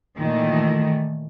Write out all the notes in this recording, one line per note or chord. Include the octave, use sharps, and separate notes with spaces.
A#2 D#3 E3 A3